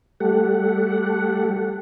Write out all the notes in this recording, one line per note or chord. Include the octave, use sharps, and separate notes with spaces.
G3 A3 G4 A4 F#5